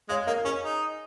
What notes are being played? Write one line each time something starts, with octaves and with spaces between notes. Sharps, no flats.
G#3 C#5 F5
A#3 A#4 D#5
A#4
C#4 G#4 C#5
D#4